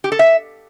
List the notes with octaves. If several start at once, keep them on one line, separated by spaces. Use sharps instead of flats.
G4
A4
E5